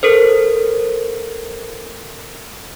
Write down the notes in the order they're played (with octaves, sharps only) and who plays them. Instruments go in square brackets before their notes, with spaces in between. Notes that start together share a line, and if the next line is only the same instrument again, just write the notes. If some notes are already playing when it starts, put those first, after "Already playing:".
[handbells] A4 A#4 C5